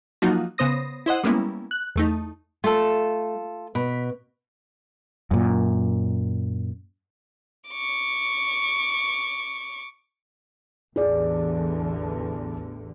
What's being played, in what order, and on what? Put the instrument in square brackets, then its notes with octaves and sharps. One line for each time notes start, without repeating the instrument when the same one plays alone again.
[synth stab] F3 F#3 A#3 D#4 F4 F#4
C#3 B3 C5 D#6 A#6
E4 C5 D#5 F#5
G3 G#3 A#3 B3 C#4 E4
F#6
E2 A3 D#4
[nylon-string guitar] A3 [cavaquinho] F4 A4
[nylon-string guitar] B2 [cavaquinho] B5
[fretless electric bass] F#2 A#2
[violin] C#6 D6
[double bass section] A1 E2 D3 [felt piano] G#4 D5